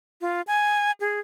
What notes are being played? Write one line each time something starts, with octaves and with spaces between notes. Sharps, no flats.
F4
G#5
G#4